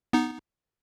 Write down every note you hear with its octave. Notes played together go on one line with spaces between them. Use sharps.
B3 D#4